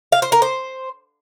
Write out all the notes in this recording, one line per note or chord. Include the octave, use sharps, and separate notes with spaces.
F5
C5
A#4
C5